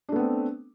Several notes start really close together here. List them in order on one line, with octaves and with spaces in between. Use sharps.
D4 A3 B3 C4